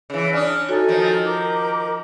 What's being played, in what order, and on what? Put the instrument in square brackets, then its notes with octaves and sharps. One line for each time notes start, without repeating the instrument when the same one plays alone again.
[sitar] C#3 E3
[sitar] C#4 D4 [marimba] D5 D#6 [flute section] F6
[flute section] D#4 A4 G#5 [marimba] F#4 C#5
[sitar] D#3 F3
[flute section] A#4 D6